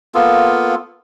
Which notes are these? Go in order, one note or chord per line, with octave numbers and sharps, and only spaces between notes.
A#3 B3 F4 A4